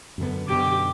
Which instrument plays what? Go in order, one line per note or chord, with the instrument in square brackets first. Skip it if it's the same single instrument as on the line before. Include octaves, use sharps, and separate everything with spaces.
[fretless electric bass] F#2 D3 B3
[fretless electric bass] F#2 B2 D3 [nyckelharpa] G4 D6